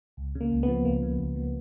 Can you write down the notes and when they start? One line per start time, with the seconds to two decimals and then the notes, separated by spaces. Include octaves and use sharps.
0.17 C#2
0.35 C#3
0.41 A#3
0.52 C#2
0.63 B3
0.68 F3
0.85 C#2 A#3
1.03 C#3
1.19 C#2
1.36 F3